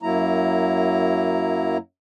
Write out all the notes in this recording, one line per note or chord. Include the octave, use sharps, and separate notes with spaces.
F#2 F#3 A#3 E4 A#5